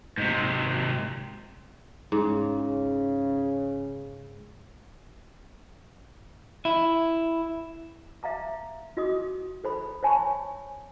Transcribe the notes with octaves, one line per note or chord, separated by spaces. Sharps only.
G#2 C3
G#2 C#3
E4
E5 F5 A#5 D6
F4 F#4 D#5 D6 D#6
A4 C5 B5
C5 C#5 G#5 A5 B5 C#6